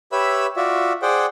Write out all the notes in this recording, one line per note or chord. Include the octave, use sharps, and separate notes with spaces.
G4 B4 C#5 E5 B5 E6
F4 F#4 D5 E5
G#4 C5 D5 F#5 G5